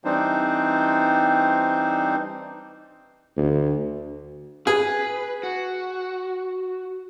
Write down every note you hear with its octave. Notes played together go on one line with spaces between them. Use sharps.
E3 G3 C4 D4 D#4 C5
D2
G#4 B4
F#4